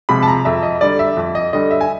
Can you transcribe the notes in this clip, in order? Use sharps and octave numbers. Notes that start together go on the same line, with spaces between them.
C3 F3 G#3 B5
A5
A#5
F2 E5
D#5
D3 G3 D5
E5
F2
D#5
D3 G3 D#5
E5
G#5